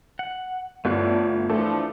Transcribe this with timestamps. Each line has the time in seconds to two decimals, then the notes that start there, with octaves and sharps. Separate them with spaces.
0.19 F#5
0.85 G1 A2 A3 F4 D5 F#6
1.50 E3 F3 A3 D4